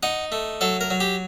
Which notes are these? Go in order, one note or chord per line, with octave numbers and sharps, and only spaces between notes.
D#4 F#5
A3
F#3 A4
A#4
F#3
G4